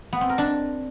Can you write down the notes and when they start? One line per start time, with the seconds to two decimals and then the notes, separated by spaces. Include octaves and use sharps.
0.13 B3
0.21 C4
0.30 A#4
0.38 D4